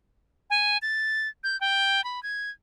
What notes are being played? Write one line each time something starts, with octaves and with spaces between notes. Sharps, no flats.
G#5
A6
G6
G5
B5
G#6